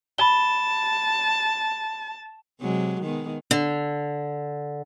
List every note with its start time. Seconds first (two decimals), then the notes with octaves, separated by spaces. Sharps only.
0.18 A5 B5 G7
2.61 C3 F#3 G#3
3.02 D#3 G#3 B3
3.51 D3